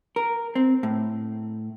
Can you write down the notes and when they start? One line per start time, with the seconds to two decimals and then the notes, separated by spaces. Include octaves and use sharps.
0.16 A#4
0.55 C4
0.83 A2